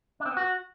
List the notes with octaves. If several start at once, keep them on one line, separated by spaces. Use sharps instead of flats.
D4
C4
B3
F#4